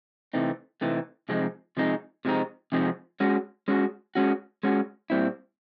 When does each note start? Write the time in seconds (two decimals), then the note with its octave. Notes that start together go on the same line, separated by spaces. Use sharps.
0.33 C3 E3 A3 C4 D#4
0.81 C3 E3 A3 C4 D#4
1.29 C3 F3 G#3 C4 D#4
1.77 C3 F3 G#3 C4 D#4
2.25 C3 F3 G#3 C4 D#4
2.72 C3 F3 G#3 C4 D#4
3.20 G#3 C#4 F#4
3.68 G#3 C#4 F#4
4.15 G#3 C#4 F#4
4.63 G#3 C#4 F#4
5.10 A#2 G3 C4 E4